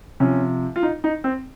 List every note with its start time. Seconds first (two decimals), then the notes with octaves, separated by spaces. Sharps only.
0.20 C3 F3 C#4
0.76 F4
0.83 D#4
1.04 D#4
1.24 C4